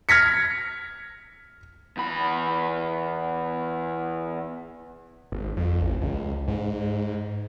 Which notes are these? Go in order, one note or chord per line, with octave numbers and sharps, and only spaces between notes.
F6 G#6 A#6 B6 C#7
E2 B5
G#1
F2
A1
C#2
G#2